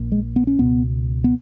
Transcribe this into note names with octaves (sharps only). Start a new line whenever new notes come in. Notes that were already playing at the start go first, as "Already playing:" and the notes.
Already playing: A#1 A#2
G#3
B3
C#4
C#2 B2 B3
B3